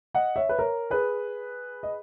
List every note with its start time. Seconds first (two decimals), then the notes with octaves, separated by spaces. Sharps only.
0.14 D#5 F#5
0.36 C#5 E5
0.49 B4
0.58 A#4 C#5
0.90 G#4 B4
1.83 D#5